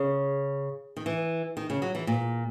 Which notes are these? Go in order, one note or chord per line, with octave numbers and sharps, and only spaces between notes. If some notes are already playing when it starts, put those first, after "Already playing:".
Already playing: C#3
D#3
E3
D#3
C#3
F#3
E3
A#2